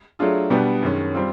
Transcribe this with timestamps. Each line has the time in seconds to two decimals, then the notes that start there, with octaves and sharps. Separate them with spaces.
0.19 F#3 A3 D4 F4 G#4
0.50 B2 G3 B3 D4 G4
0.83 F#2 D#3 G#3 C#4
1.14 G3 C4 F4